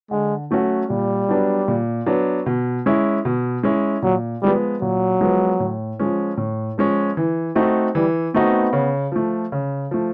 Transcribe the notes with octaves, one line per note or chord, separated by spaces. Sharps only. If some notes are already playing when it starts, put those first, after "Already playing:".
D3 G#3
F#3 A3 C#4 F#4
A#2 G3
F#3 B3 D4
A#2
F#3 B3 D4
B2
G#3 C#4 E4
B2
G#3 C#4 E4
A#2 F#3
F3 G3 G#3 B3
A#2 F#3
F3 G#3 B3
A2
F3 G#3 C#4
A2
F3 G#3 C#4
E3
A3 C4 D#4 F#4
E3 G3
A3 B3 C4 D#4 F#4
C#3
F3 A3
C#3
F3 A3